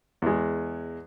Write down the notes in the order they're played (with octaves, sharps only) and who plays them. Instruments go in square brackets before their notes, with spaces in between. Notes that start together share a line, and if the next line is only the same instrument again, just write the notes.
[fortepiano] E2 G#3